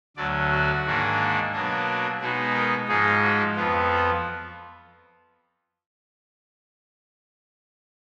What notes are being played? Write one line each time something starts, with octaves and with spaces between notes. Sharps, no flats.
D2 D3 F#3 D5
F#4
G#2 D#3 A#3 D4
B2 F#3 A#3 D4
B2 G#3 D#4 F#4
A#4
G#2 F3 G#3 D#4 G#4
F#4
F2 F3 B3 F4
F4